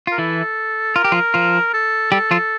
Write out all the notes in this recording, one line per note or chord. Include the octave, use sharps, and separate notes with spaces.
F4 A#4
E3 E4 A4
F4 A#4
G4
F3 F4
F3 F4
A4
G3 G4 A4
F3 F4